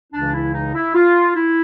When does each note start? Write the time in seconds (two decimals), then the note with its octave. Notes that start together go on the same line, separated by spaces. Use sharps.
0.13 C#2 C#3 E3 D4
0.33 E4
0.54 D#4
0.74 E4
0.95 F4
1.35 E4